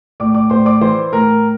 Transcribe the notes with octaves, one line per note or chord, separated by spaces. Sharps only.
A2 D5 D6
D5 D6
A2 C5 C6
D5 D6
E3 C5 C6
A2 A#4 A#5